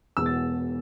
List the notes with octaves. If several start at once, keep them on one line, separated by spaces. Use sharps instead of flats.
E1 E2 B2 B3 E6
A6